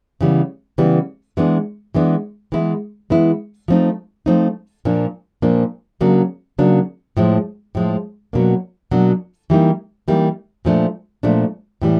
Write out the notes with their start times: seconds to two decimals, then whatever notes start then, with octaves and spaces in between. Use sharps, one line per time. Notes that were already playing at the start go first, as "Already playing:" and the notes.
0.21 C#3 E3 G3 B3
0.78 C#3 E3 G3 B3
1.37 E3 G#3 B3 D4
1.94 E3 G#3 B3 D4
2.52 E3 G#3 B3 E4
3.10 E3 G#3 B3 E4
3.68 F3 A3 C4 D#4
4.26 F3 A3 C4 D#4
4.85 A#2 F3 A#3 D4
5.42 A#2 F3 A#3 D4
6.01 C#3 F#3 A#3 D4
6.58 C#3 F#3 A#3 D4
7.17 A2 F3 G#3
7.75 A2 F3 G#3
8.33 B2 F#3 A#3 D4
8.91 B2 F#3 A#3 D4
9.50 E3 G3 A#3 D#4
10.08 E3 G3 A#3 D#4
10.65 A#2 F3 A3 D4
11.23 A#2 F3 A3 D4
11.82 A2 E3 G3